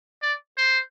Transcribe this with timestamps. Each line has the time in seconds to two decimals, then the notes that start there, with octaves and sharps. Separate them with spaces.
0.22 D5
0.58 C5